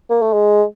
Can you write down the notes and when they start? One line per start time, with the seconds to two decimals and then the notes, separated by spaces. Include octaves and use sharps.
0.10 A#3
0.22 A3
0.33 G#3